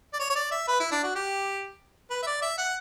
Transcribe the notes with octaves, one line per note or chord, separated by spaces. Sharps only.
D5
C#5
C#5
D5
E5
B4
E4
D4
F#4
G4
B4
E5
D5
E5
F#5